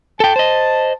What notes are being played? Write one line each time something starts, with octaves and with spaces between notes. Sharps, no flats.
A4 G5 A5
C5 D#5